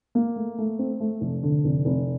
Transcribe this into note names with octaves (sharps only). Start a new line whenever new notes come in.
A#3
A3
A3
C4
A3
F1
D3
F1
F1